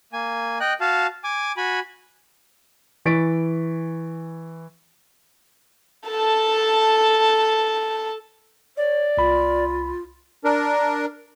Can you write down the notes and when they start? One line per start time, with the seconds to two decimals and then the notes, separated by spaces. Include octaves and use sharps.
0.13 A#3 G#5
0.60 D#5 G5 F#6
0.81 F#4 F5 A5
1.24 G#5 D6
1.57 F#4 G#5 B5
3.05 E3 C#6 A6 B6 D7
6.09 A4 A5
8.77 C#5 D5
9.17 C2 F4 B5
10.44 D4 A#4